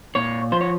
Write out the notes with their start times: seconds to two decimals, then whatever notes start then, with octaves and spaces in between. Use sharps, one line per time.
0.15 A#2 C#5
0.52 F3 C5
0.61 C#5